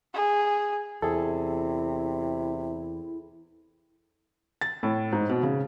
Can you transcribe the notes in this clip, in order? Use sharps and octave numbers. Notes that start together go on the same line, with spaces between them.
G#4
E2 C3 E4 G#4 A4
A6
A2
G#2
B2
C#3